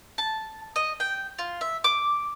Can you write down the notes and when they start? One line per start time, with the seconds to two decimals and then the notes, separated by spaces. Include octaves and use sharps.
0.18 A5
0.76 D#5
1.00 G5
1.39 F4
1.61 E5
1.84 D6